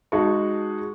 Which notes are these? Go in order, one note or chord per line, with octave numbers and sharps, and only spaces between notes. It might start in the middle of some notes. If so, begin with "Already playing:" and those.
G#3 D#4 F#4 A5 C#6